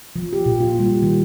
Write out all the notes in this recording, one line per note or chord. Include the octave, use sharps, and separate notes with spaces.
F3
G4
A#2
F4
G3
D#3